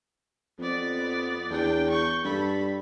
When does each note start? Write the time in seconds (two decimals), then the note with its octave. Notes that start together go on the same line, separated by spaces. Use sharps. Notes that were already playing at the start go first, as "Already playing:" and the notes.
0.58 F2 B3 D5
1.50 E2 D4 G5
1.90 C#6 G6
2.25 G2 A4 B5